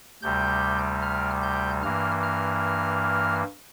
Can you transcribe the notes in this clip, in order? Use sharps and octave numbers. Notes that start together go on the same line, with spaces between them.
D2 C3 G3 G6
F6
G6
G2 E3 A#3 F6
F6